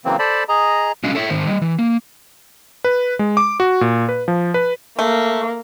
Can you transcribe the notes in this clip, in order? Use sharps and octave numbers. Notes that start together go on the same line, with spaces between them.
C#3 E3 F#3 A#3 C4
A4 C5 D5 A5 B5
G#4 D#5 A#5
F#3 G#3 C#4 D4 D#5 F5
A4 C#5 E5
G#2 D#3 C5
G3 D#5
E3
A#3
B4
G#3
D6
F#4
A#2
B4
F3
B4
A3 A#3